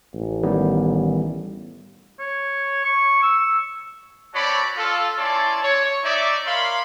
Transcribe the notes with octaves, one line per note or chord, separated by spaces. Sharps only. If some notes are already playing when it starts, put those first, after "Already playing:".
A1
D#3 G3 B3
C#5
C#6
E6
C4 F#4 C#5 D5 A5 B5
F4 A4
C#4 E4 C#5 D5 A5 C6
C#5
D#4 D5 E5
A#4 C#5 F5 B5 C6